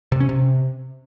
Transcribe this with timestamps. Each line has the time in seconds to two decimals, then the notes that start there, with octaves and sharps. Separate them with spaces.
0.12 C3
0.20 C#4
0.29 C3